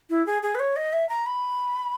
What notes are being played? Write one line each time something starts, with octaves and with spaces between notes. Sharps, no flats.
E4
G#4
G#4
B4
C#5
D#5
E5
A#5
B5